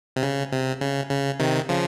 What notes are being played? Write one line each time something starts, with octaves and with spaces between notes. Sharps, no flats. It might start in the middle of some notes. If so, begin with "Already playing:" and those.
C3
C#3
C3
C#3
C#3
C3 D#3
C#3 F3